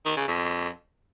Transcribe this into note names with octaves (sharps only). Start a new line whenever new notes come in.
D#3
C#3
F2